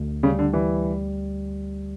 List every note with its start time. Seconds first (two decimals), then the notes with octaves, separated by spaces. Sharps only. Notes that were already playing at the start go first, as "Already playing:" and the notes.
Already playing: D2
0.23 C#3 G3
0.39 D3
0.53 E3 G3